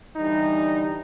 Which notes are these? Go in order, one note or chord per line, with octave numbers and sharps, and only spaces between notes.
D3 E3 G3 D#4